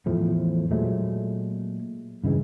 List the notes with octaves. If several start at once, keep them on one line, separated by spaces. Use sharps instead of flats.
E2 A2 F3 A3
A#2 F#3 G#3 A3
G2 C#3 E3 G#3